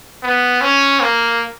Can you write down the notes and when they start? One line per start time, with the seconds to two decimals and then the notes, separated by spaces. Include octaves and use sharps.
0.23 B3
0.61 C#4
1.00 A#3